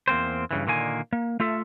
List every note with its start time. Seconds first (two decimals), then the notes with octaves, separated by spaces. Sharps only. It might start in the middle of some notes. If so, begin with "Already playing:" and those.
0.08 E2 A#3 C4 C5
0.51 G2 C#3 E3
0.67 A#2 D3 D#3 A#3 G#5
1.13 A#3
1.40 A3 F4 A4 E5